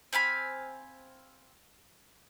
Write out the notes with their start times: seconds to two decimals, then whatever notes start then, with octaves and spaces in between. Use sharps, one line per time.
0.13 C4 F5 G#5 B5